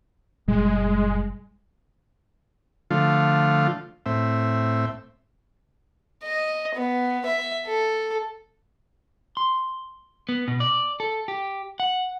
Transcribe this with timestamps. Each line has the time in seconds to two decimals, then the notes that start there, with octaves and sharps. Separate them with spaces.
0.48 F#1 A#2 G3 G#3
2.91 D3 F3 A3 F4
4.06 A2 C4 E5
6.23 D#5
6.75 B3
7.25 E5
7.67 A4
9.37 C6
10.29 B3
10.48 B2
10.60 D5
11.00 A4
11.28 G4
11.80 F#5